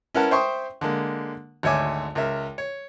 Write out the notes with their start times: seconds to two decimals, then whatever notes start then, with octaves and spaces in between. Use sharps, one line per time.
0.14 C#4 E4 A#4 B4 F#5 A5
0.31 C5 E5 G5 C6 C#6 D#6
0.81 D3 G#3 A#3
1.63 G#1 D2 C#5 E5 G#5 D6
2.15 C#2 A#4 E5
2.58 C#5